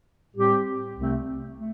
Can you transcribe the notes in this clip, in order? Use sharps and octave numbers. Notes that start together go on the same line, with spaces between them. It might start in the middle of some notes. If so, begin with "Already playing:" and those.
A2 G3 C4 G4
C2 C3 A3 C4
A3